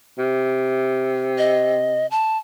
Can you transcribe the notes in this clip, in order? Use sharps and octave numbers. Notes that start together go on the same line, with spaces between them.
C3
D#5
A5